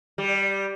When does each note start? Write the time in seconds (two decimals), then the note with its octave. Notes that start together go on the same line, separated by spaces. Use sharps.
0.18 G3